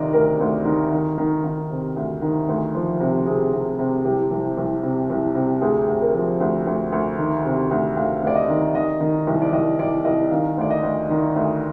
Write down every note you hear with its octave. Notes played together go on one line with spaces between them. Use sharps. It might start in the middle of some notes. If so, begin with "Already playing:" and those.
Already playing: D2 C3 D#3 D5 D#5
D2 A#4
D2
D#3
D#3
D#3
D#3
C3
D2
D#3
D2
F3
C3
C3 G#4
C3
C3
C2 G4
C2
C2
C3
C2
C3
D2 G#4
D2
A#4
F3
D2
D2
D2
D#3
C3
D2
D2 F5
D2 D5
D#5
D#3
D#3 D#5
D#3
C2
D5
C2 D#5
C2 D5
C2 D#5
D#3 F5
D2 D5
D#5
D2
D#3
D2